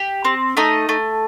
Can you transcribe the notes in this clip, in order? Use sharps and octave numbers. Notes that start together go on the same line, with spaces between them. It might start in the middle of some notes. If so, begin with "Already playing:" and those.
Already playing: G4
C4
A3 D#4 D#5
A3